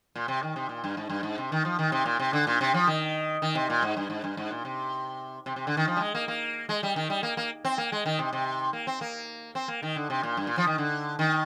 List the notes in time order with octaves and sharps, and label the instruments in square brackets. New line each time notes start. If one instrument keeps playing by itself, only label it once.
[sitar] A#2
C3
D#3
C3
A#2
G2
G#2
G2
G#2
C3
D#3
F3
D#3
C3
A#2
C3
D3
A#2
C3
F3
D#3
D#3
C3
A#2
G#2
G2
G#2
G2
G#2
A#2
C3
C3
C3
D3
D#3
F3
G3
G#3
A#3
A#3
G#3
G3
D#3
G3
A#3
A#3
C4
A#3
G#3
D#3
C3
C3
A#3
C4
A#3
C4
A#3
D#3
D3
C3
A#2
G2
A#2
F3
D#3
D3
D#3